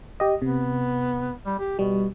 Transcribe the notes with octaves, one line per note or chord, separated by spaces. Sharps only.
G4 D#5
C3 B3
G3
G4
B2 G3